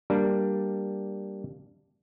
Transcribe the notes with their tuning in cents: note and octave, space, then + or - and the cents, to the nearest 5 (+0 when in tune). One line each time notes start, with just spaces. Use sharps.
G3 +0 A#3 +0 D4 +0